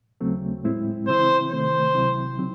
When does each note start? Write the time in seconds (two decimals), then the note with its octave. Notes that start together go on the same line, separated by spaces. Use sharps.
0.21 D#2 C#3 F#3 A3 C4
0.64 A2 G#3 C4 E4
1.07 C#3 E3 C4 E4 C5
1.51 C3 D#3 A3 C5
1.95 C#2 C3 F#3 C4 E4
2.38 C#3 F#3 C4 D#4